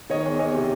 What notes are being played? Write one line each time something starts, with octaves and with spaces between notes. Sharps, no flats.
D#3 C#5 D#5
E2
E2 C#5 D#5
C3